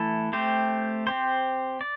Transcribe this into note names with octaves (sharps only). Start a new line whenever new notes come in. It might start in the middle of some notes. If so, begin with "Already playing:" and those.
Already playing: E3 A3 E4 A4
A3 C4 G4 C5
C4 G4 C5
D5